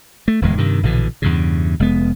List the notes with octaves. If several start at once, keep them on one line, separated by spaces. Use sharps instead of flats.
A3
D1 E2 G#3
G2 C3 D#3
A#1 B2 D3 E3
E2 G2 C#3
F1 G#3 B3